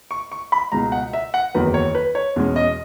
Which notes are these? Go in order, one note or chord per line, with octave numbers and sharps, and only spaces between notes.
C#6
C#6
B5
C#2 B2 G#3 A#5
F#5
E5
F#5
F#1 E2 D#3 F#3 B4
C#5
B4
C#5
E2 B2 G#3 C#4
D#5